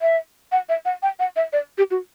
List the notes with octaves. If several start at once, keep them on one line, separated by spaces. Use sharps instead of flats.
E5
F#5
E5
F#5
G5
F#5
E5
D5
G4
F#4